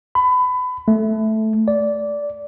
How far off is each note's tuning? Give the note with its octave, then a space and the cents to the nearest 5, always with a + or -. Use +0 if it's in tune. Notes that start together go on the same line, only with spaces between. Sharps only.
B5 +25
A3 -5
D5 -15